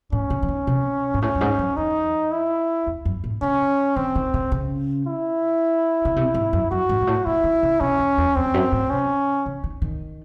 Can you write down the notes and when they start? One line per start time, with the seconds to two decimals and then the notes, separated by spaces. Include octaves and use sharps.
0.12 A2 C#4
0.30 C#3
0.43 E3
0.48 D#3
0.67 C3
1.14 G#2
1.22 A2 C#4
1.35 F#2
1.41 G#2
1.59 F#2
1.77 E2 D#4
2.32 E4
2.87 E2
3.05 F#2
3.24 A2
3.42 C#3 C#4
3.96 E3 C4
4.15 D#3
4.34 C#3
4.52 C#3
5.07 E4
6.05 C#3
6.16 C3
6.34 G#2
6.53 F#2
6.71 F#2 F#4
6.89 G#2
7.01 G#2
7.07 A2
7.26 C#3 E4
7.44 D#3
7.63 C#3
7.81 C3 C#4
7.99 E2
8.17 E2
8.36 E2 C4
8.46 E2
8.54 F#2
8.72 A2
8.90 C3 C#4
9.46 C#3
9.64 D#3
9.82 D#3